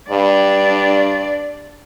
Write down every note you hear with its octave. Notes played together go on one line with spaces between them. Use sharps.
G2 D4 D5